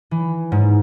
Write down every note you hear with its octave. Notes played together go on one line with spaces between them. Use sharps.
E3
G#2